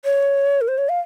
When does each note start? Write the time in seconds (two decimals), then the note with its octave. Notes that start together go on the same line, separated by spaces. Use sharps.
0.05 C#5
0.61 A#4
0.68 C5
0.78 C#5
0.89 F5